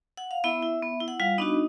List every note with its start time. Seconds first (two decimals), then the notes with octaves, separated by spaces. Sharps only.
0.17 F#5
0.31 F5
0.44 B3 E4 E5
0.62 E4
0.82 B3
1.00 E4
1.08 F#5
1.20 G3 F4 F5
1.38 B3 D4 D#4 F#4 D#5